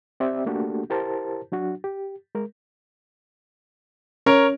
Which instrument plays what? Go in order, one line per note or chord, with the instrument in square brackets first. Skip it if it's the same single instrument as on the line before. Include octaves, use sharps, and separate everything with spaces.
[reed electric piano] C4 G4 D5 E5
A3 A#3 D4 F#4 G4 A4
E4 G4 A#4 C5 A5
F#3 D4 F#4
G4
G#3 A#4
[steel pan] C#4 [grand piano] A#4 C#5